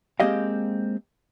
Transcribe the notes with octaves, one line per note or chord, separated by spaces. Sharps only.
G#3 A#3 C4 G4 D#5 F5